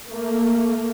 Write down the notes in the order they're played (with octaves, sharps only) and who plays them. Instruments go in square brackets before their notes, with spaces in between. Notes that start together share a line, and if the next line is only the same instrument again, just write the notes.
[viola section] A3 A#3